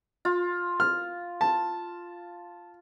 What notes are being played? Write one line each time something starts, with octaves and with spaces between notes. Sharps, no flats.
F4
F6
A5